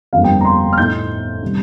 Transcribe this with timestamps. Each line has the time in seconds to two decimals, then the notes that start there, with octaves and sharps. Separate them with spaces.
0.13 G1 F2 D3 G3 A#3 F5
0.24 G5
0.41 A#5
0.45 C6
0.73 F6
0.77 A2 A3 D#4 G6
1.42 C3 D#3 G3